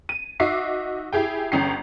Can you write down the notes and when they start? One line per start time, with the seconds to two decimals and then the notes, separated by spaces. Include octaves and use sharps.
0.09 D#7
0.40 D#4 F#4 E5 D6 C7
1.13 E4 G4 G#4 G5
1.52 G1 C#4 G5 C7